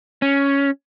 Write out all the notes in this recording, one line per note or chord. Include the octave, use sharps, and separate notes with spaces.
C#4